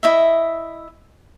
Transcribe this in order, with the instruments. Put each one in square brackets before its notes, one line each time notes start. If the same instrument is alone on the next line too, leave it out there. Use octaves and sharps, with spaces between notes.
[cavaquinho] E4 D#5 E5